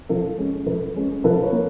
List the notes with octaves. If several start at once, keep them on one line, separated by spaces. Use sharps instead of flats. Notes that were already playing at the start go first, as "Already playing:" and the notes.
F3 A4
G#3 C#4
F3 A4 B4
G#3 C#4
F3 A4 B4
B4 C#5
A#3